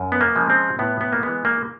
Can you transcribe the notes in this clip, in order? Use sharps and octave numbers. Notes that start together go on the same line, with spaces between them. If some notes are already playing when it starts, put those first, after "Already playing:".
Already playing: F#2
B3
A#3
C#3 F3 G#3
C4
A2 B3
B3
A#3
E3 G#3 B3
A#3